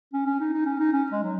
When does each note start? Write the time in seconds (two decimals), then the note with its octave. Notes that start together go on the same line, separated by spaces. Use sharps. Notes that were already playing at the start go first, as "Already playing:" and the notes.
0.13 C#4
0.27 C#4
0.40 D#4
0.53 D#4
0.66 C#4
0.80 D#4
0.93 C#4
1.12 G#3
1.23 F#3